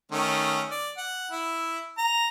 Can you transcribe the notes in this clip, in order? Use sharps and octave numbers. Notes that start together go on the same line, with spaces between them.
D#3 A3 C#4
D5
F#5
E4
A#5